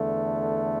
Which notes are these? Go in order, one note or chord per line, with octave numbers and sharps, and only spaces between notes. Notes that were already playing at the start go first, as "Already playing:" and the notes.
Already playing: E2 D3 A3